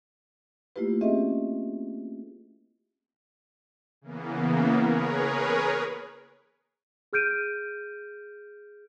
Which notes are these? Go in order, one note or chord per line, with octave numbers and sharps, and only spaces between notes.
A3 A#3 E4 F4 G4 B4
C4 C#4 G4 G#4 D#5 E5
C#3 E3 A#3 B3
G#4 A#4 B4 C#5
G#4 F6 G6 D7 D#7